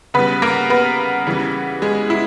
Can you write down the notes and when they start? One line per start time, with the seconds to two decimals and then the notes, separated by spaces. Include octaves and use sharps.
0.14 C#3 G3 B3 B4
0.42 A#3 A#4
0.70 B3 B4
1.27 C#3 E3 G3
1.82 G#3 G#4
2.10 E4